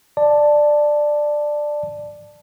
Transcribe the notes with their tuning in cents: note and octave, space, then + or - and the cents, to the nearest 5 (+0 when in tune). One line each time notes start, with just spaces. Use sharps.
D5 +10 A5 +0